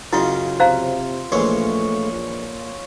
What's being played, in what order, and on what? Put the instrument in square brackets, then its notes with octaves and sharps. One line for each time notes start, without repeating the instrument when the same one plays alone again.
[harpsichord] F#2 C#3 D#5 [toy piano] E4 [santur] F4
[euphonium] C3 [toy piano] C5 F5 A#5
[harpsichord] A#1 E3 G#3 [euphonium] A3 [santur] C#5 C6
[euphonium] A#2